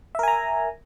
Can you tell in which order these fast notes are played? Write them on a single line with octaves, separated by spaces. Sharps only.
E5 A#4 G#5 A#5